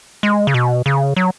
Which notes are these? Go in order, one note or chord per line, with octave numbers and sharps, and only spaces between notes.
G#3
C#3
B2
C#3
F#3